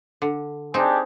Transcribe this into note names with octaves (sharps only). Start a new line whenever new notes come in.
D3
C4 D4 D#4 G4 G#4